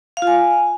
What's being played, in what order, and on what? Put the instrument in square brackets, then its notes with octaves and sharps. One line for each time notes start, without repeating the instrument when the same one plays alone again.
[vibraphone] F5
F4
G#5